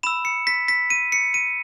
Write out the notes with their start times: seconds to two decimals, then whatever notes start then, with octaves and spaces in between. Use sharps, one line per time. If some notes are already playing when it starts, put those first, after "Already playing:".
0.03 B5 E6 E7
0.25 C#7
0.47 B6
0.68 B6
0.90 D#7
1.12 C#7
1.34 D#7